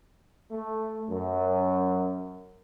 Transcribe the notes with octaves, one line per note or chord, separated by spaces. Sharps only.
A3
F#2